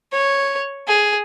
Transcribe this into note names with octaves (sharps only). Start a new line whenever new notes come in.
C#5
G#4